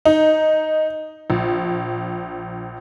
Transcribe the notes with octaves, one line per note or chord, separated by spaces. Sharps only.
D#4
A#1